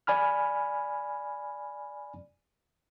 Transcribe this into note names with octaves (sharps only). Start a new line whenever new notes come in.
D5 G#5 B5 F6